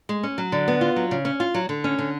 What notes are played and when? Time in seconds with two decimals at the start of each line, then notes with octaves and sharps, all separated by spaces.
0.09 G#3
0.23 C#4
0.38 F#3
0.52 D3
0.68 B3
0.81 F4
0.96 F#3
1.11 C#3
1.25 C#4
1.40 F4
1.54 F#3
1.69 D3
1.84 C#4
1.99 D3